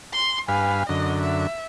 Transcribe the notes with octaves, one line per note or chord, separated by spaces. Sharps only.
C6
G2 B4 F5 G#5
F#2 D3 D#5
E5